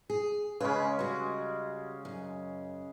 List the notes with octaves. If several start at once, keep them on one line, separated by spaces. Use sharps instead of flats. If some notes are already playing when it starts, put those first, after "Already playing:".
G#4
C#3 G#3 C#4 B4
G3 F#4
F#2